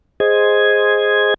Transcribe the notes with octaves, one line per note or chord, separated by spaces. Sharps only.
G#4 C5 D#5 G#6